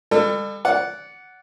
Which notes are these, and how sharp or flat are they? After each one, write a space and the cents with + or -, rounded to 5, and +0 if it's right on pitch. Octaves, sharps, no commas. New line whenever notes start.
G3 +45 A4 +25
D5 -20 F#5 +0